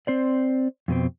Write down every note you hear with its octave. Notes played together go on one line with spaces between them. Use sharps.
C4 C5 D5
F2 B2 C4